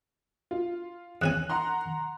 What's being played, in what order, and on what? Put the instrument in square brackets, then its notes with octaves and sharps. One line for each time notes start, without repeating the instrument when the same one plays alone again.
[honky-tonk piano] F4
[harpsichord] E2 C#4 G#5 [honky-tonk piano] F#6
[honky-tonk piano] F#5 A#5 C6